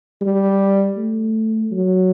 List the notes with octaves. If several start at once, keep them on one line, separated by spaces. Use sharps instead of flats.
G3
A3
F#3